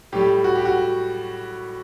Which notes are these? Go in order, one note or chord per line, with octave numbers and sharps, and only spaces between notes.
A2 G3 G4
F#4
G4
F#4